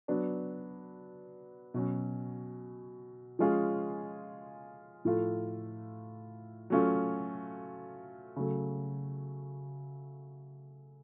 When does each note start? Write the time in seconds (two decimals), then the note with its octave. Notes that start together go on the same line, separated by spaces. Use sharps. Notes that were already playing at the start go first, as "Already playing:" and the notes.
0.08 F#3 B3 D4
1.74 B2 F#3 C#4
3.39 F3 G#3 C#4 F4 G#4
5.05 A2 F3 A3 F4
6.70 F#3 A3 C#4 F4
8.36 C#3 F#3 A3